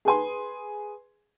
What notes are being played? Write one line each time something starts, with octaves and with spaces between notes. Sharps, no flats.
G#4 B4 G#5 C6